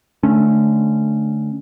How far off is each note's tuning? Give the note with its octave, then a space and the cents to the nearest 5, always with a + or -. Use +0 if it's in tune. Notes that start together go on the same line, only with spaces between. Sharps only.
D3 +0 A3 -15 C#4 +0